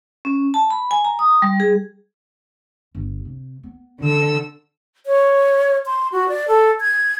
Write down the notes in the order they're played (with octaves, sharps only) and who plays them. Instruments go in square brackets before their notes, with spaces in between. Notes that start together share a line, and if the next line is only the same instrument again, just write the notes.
[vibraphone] C#4
A5
B5
G#5
A#5
D#6
G3
G#4
[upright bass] G1
C3
B3
[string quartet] D3 A4 E6 [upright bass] E3 F3
[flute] C#5
C6
F#4
D5
A4
G#6